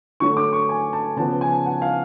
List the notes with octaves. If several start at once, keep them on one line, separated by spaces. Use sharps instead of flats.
D3 F#3 A3 C#6
D6
C#6
G#5
A5
C#3 F3 B3 A5
G#5
F#5
F5